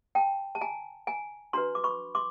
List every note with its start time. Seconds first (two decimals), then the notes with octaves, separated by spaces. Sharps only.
0.15 G5 A5
0.55 A5
0.61 G#5 A#5
1.07 G#5 A#5
1.53 D4 F#4 B4 A#5 C6
1.75 D6
1.84 B5 C#6
2.15 C6 D6